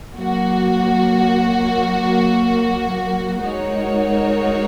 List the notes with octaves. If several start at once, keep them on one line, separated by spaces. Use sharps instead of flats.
F#3 A#3 F#4
G#3 D#4 F#4 A#4 C#5